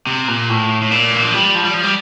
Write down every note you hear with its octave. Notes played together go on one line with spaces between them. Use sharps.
C3
A#2
A2
A2
A#2
E3
F3
G3
F3
G3
F3
G3